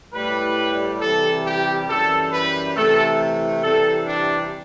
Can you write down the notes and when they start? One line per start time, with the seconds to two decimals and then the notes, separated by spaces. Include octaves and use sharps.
0.13 A2 G3 B4
1.01 C3 E3 G3 A4
1.44 G4
1.88 F#2 E3 G3 A4
2.32 B4
2.75 C3 E3 A3 A4
3.62 C3 E3 G3 A4
4.06 D4